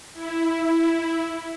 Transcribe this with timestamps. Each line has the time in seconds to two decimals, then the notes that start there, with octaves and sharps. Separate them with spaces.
0.13 E4